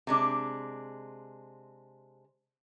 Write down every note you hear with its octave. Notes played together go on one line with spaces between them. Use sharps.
C3 G#3 D4